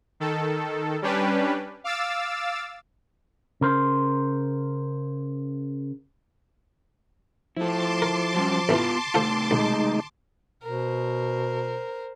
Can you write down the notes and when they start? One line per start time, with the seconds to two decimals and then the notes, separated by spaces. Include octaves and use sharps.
0.20 D#3 A4
1.02 G3 C#4 D4 G4 B4
1.84 F5 D6 E6 A6
3.61 C#3 A#4 C5
7.57 F3 E4 A4 A5 C6 D6
8.02 A#4
8.35 F#3 G3 C#4
8.69 A1 E3 B3 F4 B4
9.14 C3 D#3 A3 F4 A4 C5
9.51 B1 G#3 D#4
10.63 B2 A#4 C5